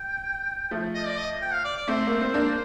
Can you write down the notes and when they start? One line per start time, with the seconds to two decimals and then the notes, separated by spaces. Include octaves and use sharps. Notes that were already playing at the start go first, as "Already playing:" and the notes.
Already playing: G5
0.71 F3 A3
0.94 D#5
1.07 D5
1.18 D#5
1.41 G5
1.53 F5
1.64 D5
1.76 D5
1.88 A3 C4 C5
2.07 A#3
2.21 C4
2.34 A#3 D4